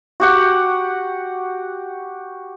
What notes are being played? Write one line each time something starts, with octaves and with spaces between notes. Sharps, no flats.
F#4 G4 F#5